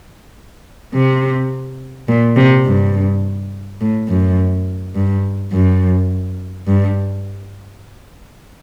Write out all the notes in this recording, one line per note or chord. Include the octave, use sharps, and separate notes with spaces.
C3
A#2
C3
G2
A2
F#2
G2
F#2
G2